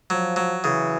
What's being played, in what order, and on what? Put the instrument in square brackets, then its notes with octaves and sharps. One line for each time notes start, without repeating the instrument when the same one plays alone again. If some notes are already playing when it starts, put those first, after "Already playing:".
[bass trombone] F3 [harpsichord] F#3
[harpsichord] F#3
[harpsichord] C#3 [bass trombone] E3